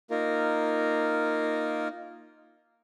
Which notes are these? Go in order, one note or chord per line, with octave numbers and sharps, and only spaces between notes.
A#3 D#4 F4 A#4